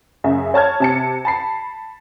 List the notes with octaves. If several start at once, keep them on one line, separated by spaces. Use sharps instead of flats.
F#2 C#3 E5
C#5 A5 F6 G#6
C3 A5 C#7
A5 B5 C7